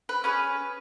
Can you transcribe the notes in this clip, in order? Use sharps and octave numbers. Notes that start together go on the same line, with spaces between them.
B4
C#4 G#4 B4